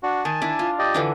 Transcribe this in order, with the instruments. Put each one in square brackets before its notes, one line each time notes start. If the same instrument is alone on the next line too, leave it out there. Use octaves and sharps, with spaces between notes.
[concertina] D4 F#4
[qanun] D#3 [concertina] G#5 A5
[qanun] D4 E4
F4
[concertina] G4 D5 D#5
[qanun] D3 E3 D4